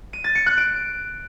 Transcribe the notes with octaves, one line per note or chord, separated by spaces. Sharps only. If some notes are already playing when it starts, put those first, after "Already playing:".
D#7
A6
C#7
F#6
D7